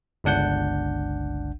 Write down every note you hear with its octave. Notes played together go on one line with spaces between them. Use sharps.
G1 C#2 D4 F#5 G6